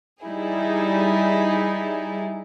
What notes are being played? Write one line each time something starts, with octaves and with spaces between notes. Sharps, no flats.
G3 D#4 E4 G#4